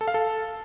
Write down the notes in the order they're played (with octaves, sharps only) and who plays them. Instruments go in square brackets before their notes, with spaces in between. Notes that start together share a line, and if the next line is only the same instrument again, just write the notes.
[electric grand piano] A4
F5
A4